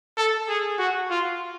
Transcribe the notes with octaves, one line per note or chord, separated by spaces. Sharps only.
A4
G#4
F#4
F4